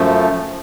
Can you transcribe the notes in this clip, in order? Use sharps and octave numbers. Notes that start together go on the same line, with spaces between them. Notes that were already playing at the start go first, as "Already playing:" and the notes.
Already playing: F#2 F3 A3